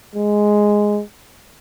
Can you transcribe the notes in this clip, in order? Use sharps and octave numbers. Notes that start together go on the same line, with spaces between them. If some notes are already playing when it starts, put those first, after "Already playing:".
G#3